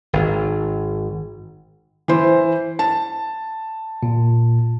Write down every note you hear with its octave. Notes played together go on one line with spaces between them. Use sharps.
G#1
E3 C5
A5
A#2